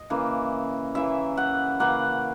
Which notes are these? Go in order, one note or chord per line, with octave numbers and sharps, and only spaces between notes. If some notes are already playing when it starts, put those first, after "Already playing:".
Already playing: D#5
C#3 E3 A#3
C#3 E3 A#3 E5
F#5
C#3 E3 A#3 F#5